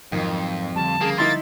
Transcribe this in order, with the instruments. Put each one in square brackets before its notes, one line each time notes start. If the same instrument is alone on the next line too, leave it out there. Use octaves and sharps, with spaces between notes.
[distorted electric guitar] F2 [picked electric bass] G#2 F3 F#3 [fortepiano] D#3
[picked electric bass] D3 F3 G3 [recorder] A5
[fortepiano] C#3 G#4 [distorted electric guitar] A#3
[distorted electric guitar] A#3 [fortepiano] D#4 E4 C6 [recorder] A6